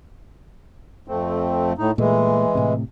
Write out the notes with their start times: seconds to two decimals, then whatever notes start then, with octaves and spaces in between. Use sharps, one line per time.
1.08 F2 A3 C4
1.78 A2 D#4
1.98 A#2 E3 G#3 A3
2.55 A2 C3